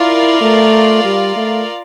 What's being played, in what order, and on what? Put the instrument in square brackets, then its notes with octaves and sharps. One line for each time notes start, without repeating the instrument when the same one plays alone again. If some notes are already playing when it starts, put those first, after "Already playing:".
Already playing: [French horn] E4 [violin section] F4 A#4 D5 F5
[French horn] A3
G3
A3